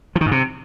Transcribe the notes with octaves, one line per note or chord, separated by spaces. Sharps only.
F3
D#3
G#2
C3